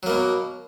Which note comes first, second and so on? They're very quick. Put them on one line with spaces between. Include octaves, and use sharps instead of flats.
F#3 A#3 B2